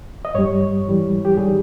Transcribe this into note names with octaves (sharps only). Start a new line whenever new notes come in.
D#5
G2 G3 C#5
G#2 E3 G3
G4
D#3 G3 G#4